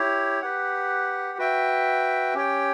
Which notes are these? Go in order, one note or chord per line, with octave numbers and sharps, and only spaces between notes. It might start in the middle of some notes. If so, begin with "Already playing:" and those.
Already playing: E4 G4 C#5
G4 B4 F#5
F#4 B4 E5 G5
C#4 G4 C#5 G5